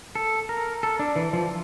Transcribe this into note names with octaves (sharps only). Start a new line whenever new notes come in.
A4
A#4
A4
D4
E3
F3